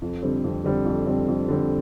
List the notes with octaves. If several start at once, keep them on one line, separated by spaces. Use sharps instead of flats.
F2
D3 G3 C4
F2
D3 G3 C4
F2
D3 G3 C4
F2
D3 G3 C4